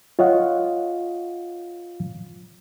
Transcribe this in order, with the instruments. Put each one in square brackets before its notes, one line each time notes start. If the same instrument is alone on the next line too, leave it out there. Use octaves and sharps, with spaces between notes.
[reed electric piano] F4 C#5 D#5 F5 F#5